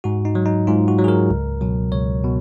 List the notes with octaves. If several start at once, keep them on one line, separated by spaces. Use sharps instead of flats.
G#2 F#4
D#4
F#3
D#4
G#2 F4
F#4
F#3
G#4
A#4
C#2
B2 F#3
C#2 C#5
B2